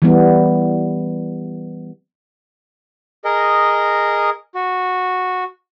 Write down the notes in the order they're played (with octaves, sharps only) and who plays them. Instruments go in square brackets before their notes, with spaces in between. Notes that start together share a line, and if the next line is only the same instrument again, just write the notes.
[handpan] E3 G3 B3
[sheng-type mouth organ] G#4 A#4 D#5
F#4